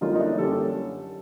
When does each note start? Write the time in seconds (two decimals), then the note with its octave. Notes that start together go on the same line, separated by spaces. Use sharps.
0.01 F#2 D3 G3 A#3 C#4 D#4 F4
0.15 D#4
0.20 D4 E4
0.38 F#2 D3 G3 A#3 C#4 G4 A4